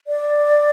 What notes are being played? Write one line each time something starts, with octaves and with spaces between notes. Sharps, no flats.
D5